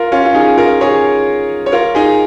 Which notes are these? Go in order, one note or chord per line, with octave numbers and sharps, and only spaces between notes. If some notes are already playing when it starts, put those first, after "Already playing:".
Already playing: F4 A#4
C#4 F4
F4
D#4 G#4
F4 A#4
G#4 C#5
C#5
F4 A#4
D#4 G#4